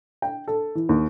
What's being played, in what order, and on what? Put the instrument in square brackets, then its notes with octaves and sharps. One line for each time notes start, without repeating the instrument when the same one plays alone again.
[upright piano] G5
A4
E3
D#2